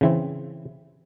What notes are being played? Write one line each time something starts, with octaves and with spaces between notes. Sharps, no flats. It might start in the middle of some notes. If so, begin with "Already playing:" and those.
C#3 E3 C4